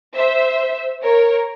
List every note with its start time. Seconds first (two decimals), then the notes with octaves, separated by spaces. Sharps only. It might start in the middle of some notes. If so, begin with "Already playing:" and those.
0.15 C5 E5
1.03 A#4 C#5